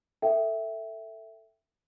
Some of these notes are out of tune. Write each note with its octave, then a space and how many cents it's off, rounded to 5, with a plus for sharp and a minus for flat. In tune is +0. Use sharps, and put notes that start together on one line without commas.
A4 +15 E5 +0 G5 -15